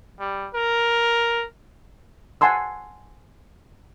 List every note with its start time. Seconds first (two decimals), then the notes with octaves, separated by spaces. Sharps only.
0.20 G3
0.55 A#4
2.41 F#5 G#5 A5 C6 E6